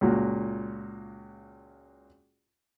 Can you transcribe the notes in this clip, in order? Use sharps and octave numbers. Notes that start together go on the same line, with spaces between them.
C#2 A#2 F#4